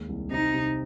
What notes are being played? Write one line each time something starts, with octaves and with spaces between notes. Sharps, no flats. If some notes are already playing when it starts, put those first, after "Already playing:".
Already playing: D#2 G#3
C2
C3 D#4
C3